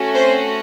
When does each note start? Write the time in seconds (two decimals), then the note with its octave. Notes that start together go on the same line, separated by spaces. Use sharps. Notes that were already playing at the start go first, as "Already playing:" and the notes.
Already playing: A3 C#4 F#4
0.14 C4 C5